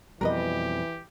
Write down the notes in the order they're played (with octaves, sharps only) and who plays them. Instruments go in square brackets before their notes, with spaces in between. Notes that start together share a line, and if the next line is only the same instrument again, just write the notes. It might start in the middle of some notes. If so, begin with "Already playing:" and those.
[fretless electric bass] F2 B2 G3 [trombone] E3 [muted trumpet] G4 [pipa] A#4 B4 D#5